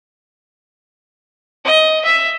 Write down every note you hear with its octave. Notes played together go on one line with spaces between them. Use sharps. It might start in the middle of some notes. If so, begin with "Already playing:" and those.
D#5
E5